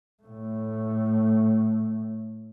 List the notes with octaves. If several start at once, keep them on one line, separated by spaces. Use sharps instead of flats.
A2 A3